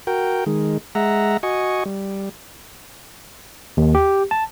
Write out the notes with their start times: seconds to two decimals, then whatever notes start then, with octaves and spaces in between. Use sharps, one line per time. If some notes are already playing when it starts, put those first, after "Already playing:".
0.07 F#4 A#4 G5
0.46 D#3 G#3
0.95 G#3 E5 F#5 A#5
1.43 F#4 D#5 G#5 C#6
1.86 G3
3.77 D#2
3.95 G4
4.31 A5